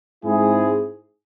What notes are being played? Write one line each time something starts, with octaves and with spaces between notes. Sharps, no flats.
G#2 G#3 C4 E4 G#4